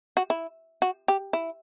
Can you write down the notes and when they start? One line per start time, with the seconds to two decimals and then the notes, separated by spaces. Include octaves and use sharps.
0.17 F#4
0.30 E4
0.82 F#4
1.08 G4
1.33 E4